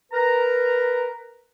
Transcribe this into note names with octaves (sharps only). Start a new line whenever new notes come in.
A#4 B4 A#5